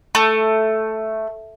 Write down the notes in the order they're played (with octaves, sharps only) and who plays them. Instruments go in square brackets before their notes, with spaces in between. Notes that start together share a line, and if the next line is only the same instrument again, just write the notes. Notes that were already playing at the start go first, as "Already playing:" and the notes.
[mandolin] A3